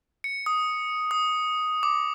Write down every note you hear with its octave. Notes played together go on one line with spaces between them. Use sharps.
C#7
D#6
D#6
D6